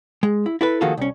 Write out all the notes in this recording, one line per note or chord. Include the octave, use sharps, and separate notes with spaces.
G#3
E4
E4 A4 B4
D#3 F3 A#3 F#4 G#4 A4
C2 C#4